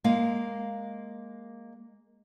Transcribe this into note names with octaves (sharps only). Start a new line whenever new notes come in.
G#3 A#3 F5